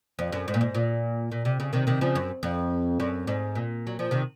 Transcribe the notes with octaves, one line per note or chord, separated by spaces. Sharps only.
F2
F#2
G#2
A#2
G#2
A#2
A#2
C3
C#3
C3 D#3
C3 D#3
C#3 F3
F#2
F2
F#2
G#2
A#2
F#3
F3
C3 D#3